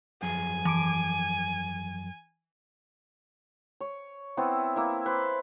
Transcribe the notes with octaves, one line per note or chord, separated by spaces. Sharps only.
F#2 F3 G#4 G#5
E3 D6 D7
C#5
B3 C4 E4
A#3 E4
B4 C5